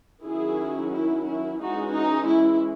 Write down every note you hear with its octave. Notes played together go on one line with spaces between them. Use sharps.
D#3 F#3 C#4 E4 G#4
E4
E4
E3 G#3 C#4 D#4 F#4
D#4
E4